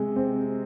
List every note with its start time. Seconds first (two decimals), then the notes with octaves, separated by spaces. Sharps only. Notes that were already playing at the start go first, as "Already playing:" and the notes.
Already playing: C3 G#3
0.16 C4